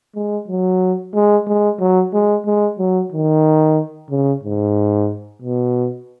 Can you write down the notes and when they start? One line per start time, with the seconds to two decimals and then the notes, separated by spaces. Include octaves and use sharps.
0.16 G#3
0.48 F#3
1.14 G#3
1.47 G#3
1.80 F#3
2.13 G#3
2.47 G#3
2.79 F#3
3.12 D#3
4.10 C#3
4.43 G#2
5.42 B2